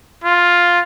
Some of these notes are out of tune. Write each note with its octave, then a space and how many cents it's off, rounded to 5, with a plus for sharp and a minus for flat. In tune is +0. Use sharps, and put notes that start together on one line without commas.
F4 +5